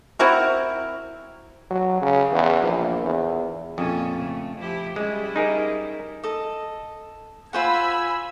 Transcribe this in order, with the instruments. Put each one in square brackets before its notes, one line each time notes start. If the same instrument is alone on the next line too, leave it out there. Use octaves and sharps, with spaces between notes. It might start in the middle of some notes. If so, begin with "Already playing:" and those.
[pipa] C4 E4 F#4 A#4
[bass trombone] F#3
C#3
E2
A#1
E2
[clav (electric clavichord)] F2 [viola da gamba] A#2 C#4 A4
[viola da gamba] C#3 A3
F3 E4 G4
[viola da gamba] G3 C#4 E4 [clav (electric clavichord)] G#3
[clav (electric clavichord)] D#4 G#4 A#4
[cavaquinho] A4 D#5
[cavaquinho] F4 C5 F#5 [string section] G#5 B5 E6